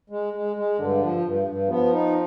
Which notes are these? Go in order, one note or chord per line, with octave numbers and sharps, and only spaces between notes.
G#3
G#3
G#3
G2 D3
F3
G2
G2
F3 B3
D#4